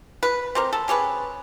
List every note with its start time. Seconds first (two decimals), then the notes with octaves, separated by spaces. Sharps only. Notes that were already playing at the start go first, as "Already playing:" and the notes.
0.23 B4
0.55 C4 G4 A#4
0.73 A4
0.88 C#4 G4 G#4 B4